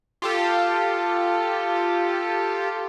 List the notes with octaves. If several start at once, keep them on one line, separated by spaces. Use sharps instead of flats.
F4 G4 A4